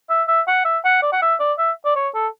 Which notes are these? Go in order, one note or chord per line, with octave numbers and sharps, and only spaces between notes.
E5
E5
F#5
E5
F#5
D5
F#5
E5
D5
E5
D5
C#5
A4